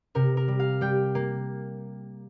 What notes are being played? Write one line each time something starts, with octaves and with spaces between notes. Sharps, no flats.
C3 A#4
A#4
G3
F5
G3 G5
A#3